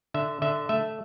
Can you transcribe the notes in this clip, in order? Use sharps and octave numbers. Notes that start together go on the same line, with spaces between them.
D3 E5
D3 E5
A3 E5